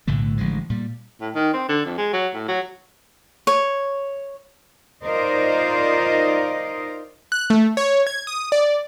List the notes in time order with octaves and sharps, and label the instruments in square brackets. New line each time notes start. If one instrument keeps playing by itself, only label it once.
[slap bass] B1 A2 D3 A3
A1 D3 F3 G#3
A#2 G3
[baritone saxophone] A2
D#3
C4
D3
F2
G#3
F#3
A2
F#3
[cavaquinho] C#5
[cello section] D#4 F4 A#4 C5 D5 D#5
[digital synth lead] F#6
A3
C#5
G#6
D#6
D5